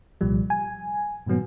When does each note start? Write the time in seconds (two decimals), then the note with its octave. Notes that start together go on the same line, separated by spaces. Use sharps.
0.21 C2 A#2 F3 G3
0.50 G#5
1.26 G2 A#2 D#3 F#3 B3